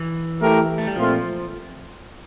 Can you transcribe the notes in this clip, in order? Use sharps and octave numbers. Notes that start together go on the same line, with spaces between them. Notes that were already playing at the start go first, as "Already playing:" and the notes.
Already playing: E3
A3 E4 G4 A#4
A3
G3
A#2 F3 A3 C4 F4